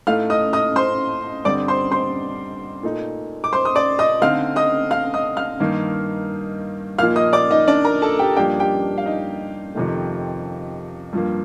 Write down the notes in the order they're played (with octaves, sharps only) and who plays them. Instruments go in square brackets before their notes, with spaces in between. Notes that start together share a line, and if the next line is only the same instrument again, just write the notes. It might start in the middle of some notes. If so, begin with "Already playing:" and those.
[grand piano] A2 A3 D#4 [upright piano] F5 F6
[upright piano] D#5 D#6
D#5 D#6
C5 C6
[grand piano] G2 D3 G3 C4 [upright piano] D5 D6
[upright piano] C5 C6
C5 C6
[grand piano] A#2 A3 D#4
[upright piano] D6
C5 C6
D#6
D5 D6
D#5 D#6
[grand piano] D3 A3 C4 D#4 [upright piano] F5 F6
[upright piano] D#5 D#6
F5 F6
D#5 D#6
F5 F6
[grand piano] G2 D#3 A#3 D#4
[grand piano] A#2 F3 A#3 D#4 [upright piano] F5 F6
[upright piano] D#5 D#6
D5 D6
D#4 D#5
D4 D5
A#4 A#5
A4 A5
G4 G5
[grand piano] G2 F3 A#3 D4 [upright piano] G4 G5
[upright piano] G4 G5
F5
D#4 D#5
[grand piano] F2 C3 D#3 A3
G2 F3 A#3